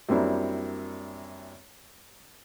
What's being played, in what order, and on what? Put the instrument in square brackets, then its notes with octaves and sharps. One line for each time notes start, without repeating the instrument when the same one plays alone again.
[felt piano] F#2 G3 A#3 C4 D4 E4